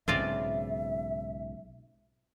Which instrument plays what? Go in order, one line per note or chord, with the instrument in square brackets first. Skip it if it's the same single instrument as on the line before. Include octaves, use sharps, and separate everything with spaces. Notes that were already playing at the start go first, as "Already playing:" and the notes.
[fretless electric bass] B1 G#2 C#3 [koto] C4 F4 D5 [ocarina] E5